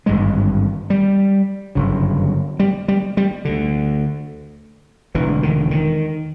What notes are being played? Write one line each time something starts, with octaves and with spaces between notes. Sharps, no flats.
G#1 G2 D3 G#3
G3
G1 F#2 C#3
G3
G3
G3
D2 D3
E1 D2 D3 E3
D#3
D#3